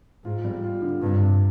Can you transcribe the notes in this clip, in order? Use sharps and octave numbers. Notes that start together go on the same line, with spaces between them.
G#2 F4
G3
F4
D3
G2 C3
C3